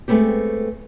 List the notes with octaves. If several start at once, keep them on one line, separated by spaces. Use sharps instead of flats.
G#3 A3 B3 C4 G4